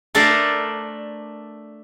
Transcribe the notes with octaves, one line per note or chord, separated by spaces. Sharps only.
A3 D4 A4 A#4 C5 D5